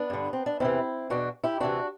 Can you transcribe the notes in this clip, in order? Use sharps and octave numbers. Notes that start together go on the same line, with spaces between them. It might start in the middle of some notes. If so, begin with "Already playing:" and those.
Already playing: B3 D4
G2 D3
C4
D4
E2 C3 E3 C4 E4
E2 B2 D4 F#4
E4 G4
D2 C3 E3 D4 F#4